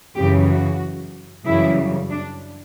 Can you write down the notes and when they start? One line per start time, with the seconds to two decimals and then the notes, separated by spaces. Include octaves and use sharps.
0.17 F#2 C#3 E3 G4
0.49 F#4
1.46 F#2 C#3 E3 G3 E4
2.11 D4